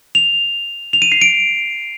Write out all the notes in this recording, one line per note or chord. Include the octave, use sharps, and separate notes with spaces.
F7
F7
D#7
C7
D7